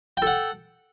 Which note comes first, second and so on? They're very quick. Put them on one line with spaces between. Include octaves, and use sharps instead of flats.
G5 A4 F#5